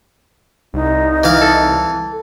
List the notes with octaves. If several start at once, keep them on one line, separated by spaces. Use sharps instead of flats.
C2 D#4
E3 F5
A4